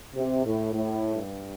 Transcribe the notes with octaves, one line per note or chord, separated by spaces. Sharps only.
C3
A2
A2
G2